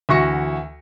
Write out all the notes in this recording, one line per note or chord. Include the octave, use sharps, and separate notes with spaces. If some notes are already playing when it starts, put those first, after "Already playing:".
D2 E3 F#4 C#6 A#6 C#7